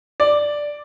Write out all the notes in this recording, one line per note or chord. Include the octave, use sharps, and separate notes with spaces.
D5